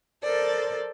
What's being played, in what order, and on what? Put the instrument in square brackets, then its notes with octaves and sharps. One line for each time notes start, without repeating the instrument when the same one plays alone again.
[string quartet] A4 A#4 C5 D5